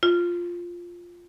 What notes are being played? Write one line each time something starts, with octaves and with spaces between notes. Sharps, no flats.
F4